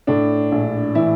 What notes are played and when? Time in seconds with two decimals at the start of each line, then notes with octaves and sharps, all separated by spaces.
0.07 A2 D4
0.52 A#1
0.95 E3 E4